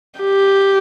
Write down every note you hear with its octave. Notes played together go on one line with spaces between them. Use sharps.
G4